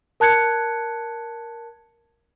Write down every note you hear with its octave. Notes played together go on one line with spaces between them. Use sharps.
A#4 A5 F#6 G#6 C#7